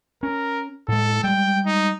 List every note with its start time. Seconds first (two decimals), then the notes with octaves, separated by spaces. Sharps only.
0.23 C#4 A#4
0.88 A2 G#3 A4
1.24 G3 G#3 G5
1.65 D#4